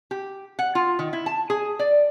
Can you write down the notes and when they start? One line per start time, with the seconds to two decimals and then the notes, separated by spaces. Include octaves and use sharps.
0.11 G4
0.59 F#5
0.75 F4
0.99 D#3
1.13 E4
1.26 A5
1.50 G#4
1.79 D5